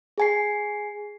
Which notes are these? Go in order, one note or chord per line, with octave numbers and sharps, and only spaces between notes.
G#4 G#5 C7